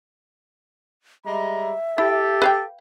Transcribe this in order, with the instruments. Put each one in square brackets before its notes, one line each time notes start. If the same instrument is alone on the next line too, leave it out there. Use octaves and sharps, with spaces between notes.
[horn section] G3 G#3 A#5 [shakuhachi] E5
[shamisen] E4 [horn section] G4 [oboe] A4
[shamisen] B4 F5 G5